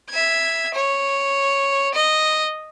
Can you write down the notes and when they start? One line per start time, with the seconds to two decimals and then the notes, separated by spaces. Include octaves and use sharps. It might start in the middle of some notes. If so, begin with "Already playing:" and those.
0.10 E5 G#6
0.74 C#5
1.95 D#5